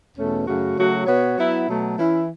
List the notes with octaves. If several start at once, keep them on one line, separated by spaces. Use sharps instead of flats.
E2 B2 A3 C#4 A4
F#2 C#3 A3 F#4
C#3 F#3 A3 F#4
B2 B3 F#4 C#5
F#3 B3 E4
B2 F#3 A3
E3 C#4 E4